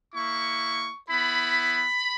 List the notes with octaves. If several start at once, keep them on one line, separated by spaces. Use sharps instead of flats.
A#3 E4 C#6
B3 E4 B5